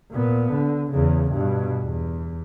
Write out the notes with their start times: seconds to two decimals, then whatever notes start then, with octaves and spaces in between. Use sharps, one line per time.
0.11 A#2 B3
0.52 D3
0.92 E2 C#3
1.32 G2 B2
1.82 E2